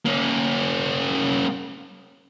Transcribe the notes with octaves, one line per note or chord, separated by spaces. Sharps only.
A#3 C#4